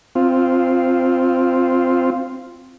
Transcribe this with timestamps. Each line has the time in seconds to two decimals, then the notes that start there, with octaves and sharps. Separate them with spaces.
0.15 C4 F4